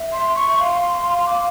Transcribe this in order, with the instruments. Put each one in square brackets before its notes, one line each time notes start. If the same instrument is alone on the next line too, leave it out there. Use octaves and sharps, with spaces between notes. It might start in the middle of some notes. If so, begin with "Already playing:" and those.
Already playing: [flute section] E5
[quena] C6
C#6
[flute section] F5 [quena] C6
[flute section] F5 [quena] D6